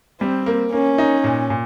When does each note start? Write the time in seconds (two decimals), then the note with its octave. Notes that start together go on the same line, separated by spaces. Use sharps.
0.21 G3 C4
0.46 A#3
0.73 A#3 C#4
0.98 D#4
1.24 A#2
1.50 A#2